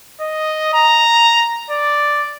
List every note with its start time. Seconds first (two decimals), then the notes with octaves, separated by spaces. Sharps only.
0.21 D#5
0.74 A#5
1.70 D5